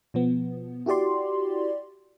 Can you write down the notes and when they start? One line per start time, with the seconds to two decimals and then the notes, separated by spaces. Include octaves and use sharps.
0.14 B2 F3 B3
0.86 E4 F#4 G4 D5 C6